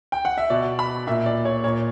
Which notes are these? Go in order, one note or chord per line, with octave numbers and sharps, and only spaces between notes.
G5
F#5
E5
B2 D5
B5
A#2 E5
D5
C#5
A#2 C#5